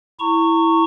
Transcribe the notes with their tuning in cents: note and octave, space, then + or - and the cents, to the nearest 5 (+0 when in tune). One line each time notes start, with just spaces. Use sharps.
E4 +0 A#5 -35 C#6 +0